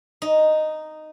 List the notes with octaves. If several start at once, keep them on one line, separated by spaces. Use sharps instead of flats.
D#4